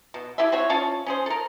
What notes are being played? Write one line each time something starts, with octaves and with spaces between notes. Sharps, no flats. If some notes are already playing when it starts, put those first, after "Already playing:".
B2
E4 G4 A4 E5
C4 F#4 C#5
C#4 F4 C#5 A5
C#4 G#4 C5
A4 A#4